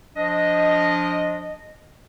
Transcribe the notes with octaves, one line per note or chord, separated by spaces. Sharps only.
F3 D4 D#5